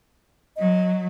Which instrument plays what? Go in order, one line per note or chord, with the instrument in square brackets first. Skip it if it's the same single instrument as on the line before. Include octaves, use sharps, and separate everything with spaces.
[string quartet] F#3 [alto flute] D#5